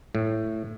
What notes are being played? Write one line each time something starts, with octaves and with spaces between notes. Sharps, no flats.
A2